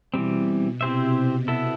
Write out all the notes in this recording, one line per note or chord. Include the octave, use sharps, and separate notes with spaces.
B2 E3 G3 C4
C3 C4 E4 G4 C5 E5
B3 E4 A4 E5